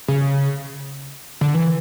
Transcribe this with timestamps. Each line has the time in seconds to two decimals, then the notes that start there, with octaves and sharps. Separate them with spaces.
0.08 C#3
1.41 D3
1.54 E3